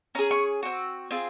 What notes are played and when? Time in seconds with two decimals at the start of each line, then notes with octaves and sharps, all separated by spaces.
0.15 C#4 G#4 A#5
0.31 C#6
0.63 C4 F#4
1.11 C4 F4 G#4